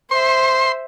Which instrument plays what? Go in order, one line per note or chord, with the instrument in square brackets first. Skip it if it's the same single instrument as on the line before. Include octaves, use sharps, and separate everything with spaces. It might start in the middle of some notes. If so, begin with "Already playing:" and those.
[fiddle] C5 E5 [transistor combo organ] C6